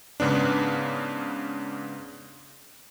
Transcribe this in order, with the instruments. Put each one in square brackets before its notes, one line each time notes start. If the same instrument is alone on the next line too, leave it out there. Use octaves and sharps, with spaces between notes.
[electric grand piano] G#2 C#3 B3 D4